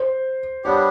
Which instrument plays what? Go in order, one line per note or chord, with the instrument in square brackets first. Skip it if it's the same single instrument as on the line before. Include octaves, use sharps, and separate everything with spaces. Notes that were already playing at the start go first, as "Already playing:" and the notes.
Already playing: [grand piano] C5
[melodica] G3 B3 D4 G4 [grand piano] C#5